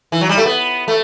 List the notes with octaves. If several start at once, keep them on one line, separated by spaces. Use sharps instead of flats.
E3
F#3
G3
A3
B3
A3